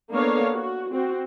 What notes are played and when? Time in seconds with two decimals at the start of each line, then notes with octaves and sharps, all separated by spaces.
0.11 A#3 B3 D4 A4 C#5 F5
0.54 F#4
0.91 C4 F#4